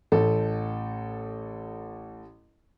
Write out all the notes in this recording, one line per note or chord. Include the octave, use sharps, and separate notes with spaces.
A1 A4